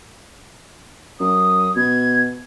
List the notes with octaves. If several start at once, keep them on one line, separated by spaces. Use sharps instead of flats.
F#2 D#6
B2 G#6